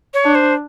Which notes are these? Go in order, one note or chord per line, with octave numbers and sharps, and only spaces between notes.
C#5
D4
C5